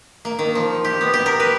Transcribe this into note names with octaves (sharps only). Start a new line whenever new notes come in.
A#3
D#3
F3
G4
B3
G4
A#4
B4